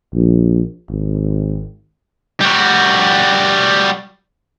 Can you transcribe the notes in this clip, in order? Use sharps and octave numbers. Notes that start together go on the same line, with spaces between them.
A#1
G#1
G3 F#4